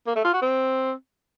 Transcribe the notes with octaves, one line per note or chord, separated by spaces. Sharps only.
A#3
A3
F4
F#4
C4